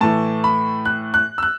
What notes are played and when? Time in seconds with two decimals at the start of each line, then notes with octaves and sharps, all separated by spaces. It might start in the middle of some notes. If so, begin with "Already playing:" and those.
0.01 A2 E3 A3 A5
0.44 B5
0.85 F#6
1.14 F#6
1.38 E6
1.43 F#6